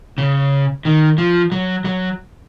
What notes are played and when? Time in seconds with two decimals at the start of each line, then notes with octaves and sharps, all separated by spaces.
0.18 C#3
0.85 D#3
1.18 F3
1.52 F#3
1.85 F#3